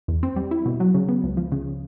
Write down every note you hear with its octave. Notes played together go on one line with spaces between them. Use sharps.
E2
C4
G3
E4
B2
F#3
C#3
B3
C#2
F3
C#3